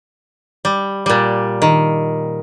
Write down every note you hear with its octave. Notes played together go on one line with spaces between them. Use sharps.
G3
A#2 G3
D#3